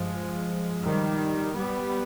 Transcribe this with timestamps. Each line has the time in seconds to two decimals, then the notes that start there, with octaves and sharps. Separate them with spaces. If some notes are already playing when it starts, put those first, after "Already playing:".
Already playing: G2 F3 G#3
0.83 D#3 G3
1.55 G3 B3